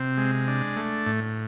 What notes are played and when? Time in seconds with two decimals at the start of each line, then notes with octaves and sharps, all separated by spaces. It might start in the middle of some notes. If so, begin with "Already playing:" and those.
Already playing: C3 C4
0.18 G#3
0.48 D4
0.77 A3
1.06 A2